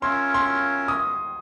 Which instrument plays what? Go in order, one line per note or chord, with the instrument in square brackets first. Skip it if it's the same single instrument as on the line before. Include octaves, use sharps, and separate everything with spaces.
[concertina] C#4 F4 A#4 C#5 E5 [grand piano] C6
[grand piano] C6
D#6